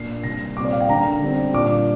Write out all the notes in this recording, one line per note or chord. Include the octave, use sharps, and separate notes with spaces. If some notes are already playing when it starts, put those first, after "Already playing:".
Already playing: A#2 A#3 D4 C7
C3 G3 A#3 A#6
A#2 G3 C4 D6
D5
F5
G5
D3 A#3 D4 A#5
D3 G3 C4
A#2 G3 D4 D6